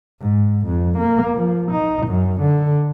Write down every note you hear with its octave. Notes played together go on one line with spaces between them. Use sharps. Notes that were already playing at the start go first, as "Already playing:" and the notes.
G#2
F2
A#3
F3
D#4
F#2
D3